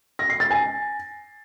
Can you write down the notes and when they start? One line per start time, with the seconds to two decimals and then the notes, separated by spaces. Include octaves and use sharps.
0.19 A#6
0.30 C7
0.40 A6
0.51 G#5